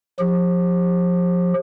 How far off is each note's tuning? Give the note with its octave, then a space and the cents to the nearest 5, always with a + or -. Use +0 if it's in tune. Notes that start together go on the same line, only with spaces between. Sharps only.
F3 +35 G4 +20